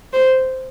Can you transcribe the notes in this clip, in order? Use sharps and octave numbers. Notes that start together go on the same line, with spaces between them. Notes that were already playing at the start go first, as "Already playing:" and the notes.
C5